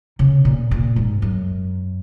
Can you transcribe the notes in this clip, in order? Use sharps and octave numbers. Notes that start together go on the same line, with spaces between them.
C#3
A#2
A#2
G#2
F#2